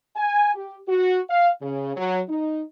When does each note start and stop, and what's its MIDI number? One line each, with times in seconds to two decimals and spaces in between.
0.17 0.55 80
0.55 0.78 67
0.88 1.21 66
1.30 1.51 77
1.62 1.95 49
1.97 2.21 54
2.29 2.62 63